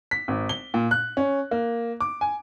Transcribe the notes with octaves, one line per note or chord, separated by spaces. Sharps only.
B6
G#1
G7
A#2
F#6
C#4
A#3
D6
G#5